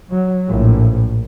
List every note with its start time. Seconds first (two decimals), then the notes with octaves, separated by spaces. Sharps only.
0.11 F#3
0.48 A#1 A2